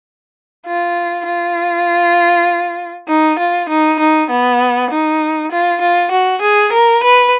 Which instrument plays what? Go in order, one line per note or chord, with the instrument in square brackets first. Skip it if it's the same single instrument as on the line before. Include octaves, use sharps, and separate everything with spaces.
[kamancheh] F4
F4
D#4
F4
D#4
D#4
B3
D#4
F4
F4
F#4
G#4
A#4
B4